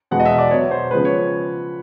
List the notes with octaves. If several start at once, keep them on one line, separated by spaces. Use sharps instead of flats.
E2 B2 G#3 B3 F#5
D#5
E5
D5
B2 F#3 B3 C#5
C5
C#3 F3 G#3 B3 B4
C#5